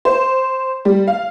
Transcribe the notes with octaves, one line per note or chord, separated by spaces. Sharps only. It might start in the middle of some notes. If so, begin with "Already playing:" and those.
C5
G3
F5